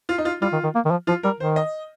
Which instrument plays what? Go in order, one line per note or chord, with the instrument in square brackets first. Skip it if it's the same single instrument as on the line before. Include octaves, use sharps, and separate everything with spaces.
[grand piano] F4
D#4
F4
[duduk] G3 [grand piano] F4
[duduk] D#3
D#3
A#3
D#3
F3
[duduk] F3 [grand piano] F4
[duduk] G3 [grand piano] A#4
[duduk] D#3 [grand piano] C5
[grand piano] D#5